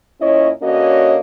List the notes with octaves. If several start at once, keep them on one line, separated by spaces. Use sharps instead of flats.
A#2 C#4 E4 C#5 D#5
D3 A#3 C#4 F#4 C#5 D#5